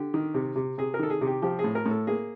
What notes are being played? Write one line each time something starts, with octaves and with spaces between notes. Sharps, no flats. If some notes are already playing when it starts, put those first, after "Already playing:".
Already playing: D3 G4
D#3
C3
C3
C3 G#4
A#4
D#3 A4
G#4
C3
G4
F3 G4
G#4
A2
A#4
A2
A4
A#3 G#4